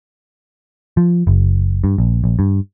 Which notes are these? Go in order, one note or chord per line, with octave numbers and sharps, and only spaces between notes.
F3
F#1
G2
A#1
A#1
G2